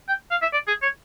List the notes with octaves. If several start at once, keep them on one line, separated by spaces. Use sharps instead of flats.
G5
F5
E5
D5
G#4
C#5